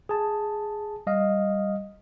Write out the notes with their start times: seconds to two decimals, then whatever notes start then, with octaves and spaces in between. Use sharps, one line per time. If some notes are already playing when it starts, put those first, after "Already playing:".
0.09 G#4 A5
1.07 G3 D#5 F5